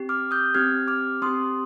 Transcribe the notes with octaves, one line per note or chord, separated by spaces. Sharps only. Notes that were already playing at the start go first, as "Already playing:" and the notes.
Already playing: C4 G4
D6 F6
D#6 G6
C4 G4 F6 G#6
D6 F6
C4 G4 C6 D#6